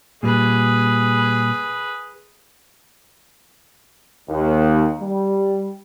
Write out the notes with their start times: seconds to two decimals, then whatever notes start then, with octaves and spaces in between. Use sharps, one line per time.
0.23 A#2 G3 G#4 B4
4.29 D#2
5.01 G3